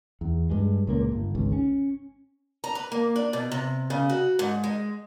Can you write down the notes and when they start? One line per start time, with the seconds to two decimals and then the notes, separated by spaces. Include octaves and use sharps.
0.21 E2
0.50 G2 G#3
0.87 C#2 A#2 A#3
1.12 G1
1.35 G#1 C#2
1.52 C#4
2.64 A#5
2.75 B4
2.92 A#3
3.16 D4
3.33 B2
3.52 C3
3.90 C#3
4.09 F#4
4.39 G#2
4.64 G#3